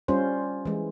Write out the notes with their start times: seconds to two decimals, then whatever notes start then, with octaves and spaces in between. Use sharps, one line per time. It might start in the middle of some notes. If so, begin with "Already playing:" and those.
0.08 G3 C#4 F4 C5
0.65 E3 G#3